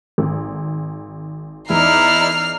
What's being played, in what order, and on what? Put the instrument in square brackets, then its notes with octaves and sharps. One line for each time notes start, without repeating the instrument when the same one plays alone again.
[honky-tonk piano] G#1
[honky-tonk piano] E2 [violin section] D#4 D5 A#5 [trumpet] E4 [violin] F6 C7